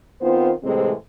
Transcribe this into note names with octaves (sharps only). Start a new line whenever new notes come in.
D#3 B3 C4 F4 C5
A2 C3 E3 G#3 C4